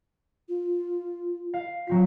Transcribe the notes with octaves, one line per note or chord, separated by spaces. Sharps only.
F4
F5
F#3 C4 F4 B6